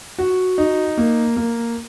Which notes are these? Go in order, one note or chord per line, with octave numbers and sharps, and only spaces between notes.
F#4
D#4
A#3
A#3